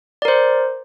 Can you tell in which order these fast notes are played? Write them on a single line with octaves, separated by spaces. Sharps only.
D5 A#4 C5